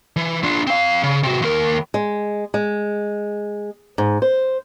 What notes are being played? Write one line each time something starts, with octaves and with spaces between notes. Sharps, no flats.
E3
D4 F4
C4 F5
C#3
C3 F#4
D#2 A#4
G#3
G#3
G#2
C5